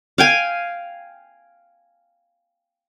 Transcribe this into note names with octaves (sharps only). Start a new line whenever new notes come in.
F5 G5 G#5